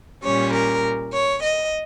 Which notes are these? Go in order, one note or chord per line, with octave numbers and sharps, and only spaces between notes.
A#2 G3 C#4 C#5
A#4
C#5
D#5